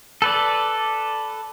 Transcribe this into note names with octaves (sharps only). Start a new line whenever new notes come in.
A4 B4 D5